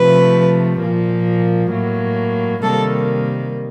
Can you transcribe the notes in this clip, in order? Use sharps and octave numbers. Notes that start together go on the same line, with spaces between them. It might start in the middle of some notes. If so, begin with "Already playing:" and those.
Already playing: C3 F3 A3 B4
A#2 F3 A#3
A2 F#3 A#3
C3 D#3 G3 A#3 A4